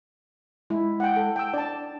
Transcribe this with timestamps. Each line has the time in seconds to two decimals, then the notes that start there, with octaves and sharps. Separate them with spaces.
0.70 G#3 E4
1.00 F#5 G5
1.16 A4
1.36 G5 E6
1.54 D4 D5 A5